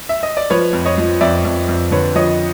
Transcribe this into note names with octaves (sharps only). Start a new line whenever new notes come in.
E5
D#5
D5
F3 B4 C#5
F2
C#5 D#5
F3
F2 D5 E5
F2
F2
D3 B4 C#5
F3 C#5 D#5